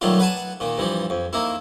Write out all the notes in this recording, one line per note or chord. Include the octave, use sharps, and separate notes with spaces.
B1 D#3 F#3 G3 A3 F4
B4 F#5 G#5 A5 B5
A#2 D#3
G2 E3 F3
F2
D#3 A#3 E4